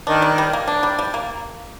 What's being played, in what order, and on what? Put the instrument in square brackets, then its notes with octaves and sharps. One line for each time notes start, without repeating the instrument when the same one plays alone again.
[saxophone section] D#3 [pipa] D4
[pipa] G3
G3
A#3
D4
G3
G3
A#3